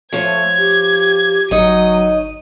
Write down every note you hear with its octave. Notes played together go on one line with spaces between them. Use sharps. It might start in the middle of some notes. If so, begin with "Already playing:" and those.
F3 A3 C#5 G#6
G4
G1 F#3 D#4 C#5 D#5 D#7